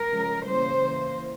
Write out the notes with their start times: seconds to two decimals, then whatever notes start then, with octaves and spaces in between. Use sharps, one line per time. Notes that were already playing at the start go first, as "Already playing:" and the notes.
Already playing: A#4
0.11 C#3 F3 G#3
0.46 C#3 E3 G3 A#3 C5
0.82 E3 A#3